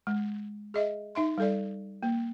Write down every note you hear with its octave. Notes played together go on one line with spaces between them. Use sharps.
G#3
G#4 D#5 E5
D#4 E5 C6
G3 A4 D5
A#3